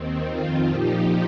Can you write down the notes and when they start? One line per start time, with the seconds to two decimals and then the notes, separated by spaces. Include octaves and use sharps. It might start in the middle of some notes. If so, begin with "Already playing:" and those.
Already playing: D#2 D#3 C4
0.30 F2 D#3 C4 F4
0.70 A#2 F3 D#4 G4